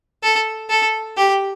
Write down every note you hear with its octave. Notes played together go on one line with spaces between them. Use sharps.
A4
A4
G4